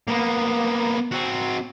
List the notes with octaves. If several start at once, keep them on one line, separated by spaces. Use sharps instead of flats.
A#3 B3
C4 F#4